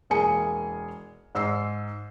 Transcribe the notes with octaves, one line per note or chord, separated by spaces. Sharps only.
E1 A#3 G#4 G#5 C#7
G#2 E6 C7